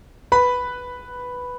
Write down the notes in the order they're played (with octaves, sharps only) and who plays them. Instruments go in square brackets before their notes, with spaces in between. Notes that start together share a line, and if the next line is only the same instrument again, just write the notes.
[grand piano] B4 B5